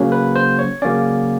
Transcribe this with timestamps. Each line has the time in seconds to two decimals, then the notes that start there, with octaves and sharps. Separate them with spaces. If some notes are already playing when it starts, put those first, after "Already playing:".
Already playing: C#3 F#3 A#3 C#4
0.12 B4
0.36 C5
0.59 C#5
0.82 C#3 F#3 A#3 C#4 D5